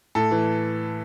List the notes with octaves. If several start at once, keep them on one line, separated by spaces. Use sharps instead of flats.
A2 A4
E3